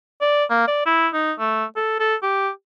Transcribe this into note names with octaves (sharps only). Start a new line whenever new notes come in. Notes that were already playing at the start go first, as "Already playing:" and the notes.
D5
A#3
D5
E4
D#4
A3
A4
A4
G4